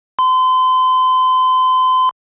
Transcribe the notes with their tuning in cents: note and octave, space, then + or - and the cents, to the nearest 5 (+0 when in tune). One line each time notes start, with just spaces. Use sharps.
C6 -35